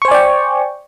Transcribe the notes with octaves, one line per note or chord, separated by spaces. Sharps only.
C5 D5 G5 G#5 C#6